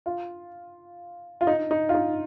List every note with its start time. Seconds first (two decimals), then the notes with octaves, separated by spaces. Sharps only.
0.06 F4
1.41 F4
1.47 D#4
1.71 D#4
1.89 F4
1.95 D#4